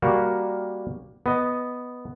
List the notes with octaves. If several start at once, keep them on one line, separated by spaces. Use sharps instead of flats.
G3 A#3 F#4 A#4
B3 D#5